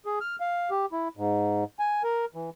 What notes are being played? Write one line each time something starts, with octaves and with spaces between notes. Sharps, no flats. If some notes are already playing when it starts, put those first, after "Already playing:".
G#4
F6
F5
G4
E4
G#2
G#5
A#4
E3